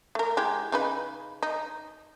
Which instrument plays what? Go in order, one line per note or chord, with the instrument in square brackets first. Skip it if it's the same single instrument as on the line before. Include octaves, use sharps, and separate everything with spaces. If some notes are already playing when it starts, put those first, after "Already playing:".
[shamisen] A3 A#4
G#3 E4 G4
C#3 D#4 B4
D#4